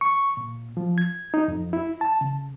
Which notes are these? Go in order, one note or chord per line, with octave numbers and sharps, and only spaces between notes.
C#6
A#2
F3
G#6
D#4
F2
E4
A5
C#3